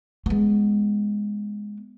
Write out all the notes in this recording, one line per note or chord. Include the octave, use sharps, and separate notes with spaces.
G#3 B3